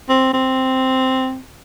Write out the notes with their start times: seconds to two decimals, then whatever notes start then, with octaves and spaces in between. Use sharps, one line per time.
0.09 C4
0.33 C4